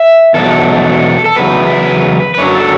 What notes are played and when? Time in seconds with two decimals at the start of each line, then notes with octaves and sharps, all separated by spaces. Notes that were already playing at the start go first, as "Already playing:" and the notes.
Already playing: E5
0.34 E2 B2 F#3 A4
1.26 A4
1.37 E2 C#3 F#3 B4
2.35 B4
2.38 F#2 D3 F#3 C#5
2.55 A4